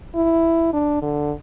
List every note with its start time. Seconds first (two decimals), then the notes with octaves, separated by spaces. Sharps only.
0.15 E4
0.73 D4
1.02 D3